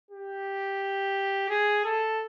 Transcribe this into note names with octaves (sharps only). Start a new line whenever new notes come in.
G4
G#4
A4